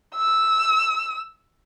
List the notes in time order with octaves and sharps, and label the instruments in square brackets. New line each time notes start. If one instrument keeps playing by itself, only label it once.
[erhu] E6